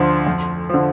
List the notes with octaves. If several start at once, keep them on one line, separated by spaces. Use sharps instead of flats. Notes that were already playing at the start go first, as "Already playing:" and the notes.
Already playing: D2 D3 F3 C6
F2
D3 F3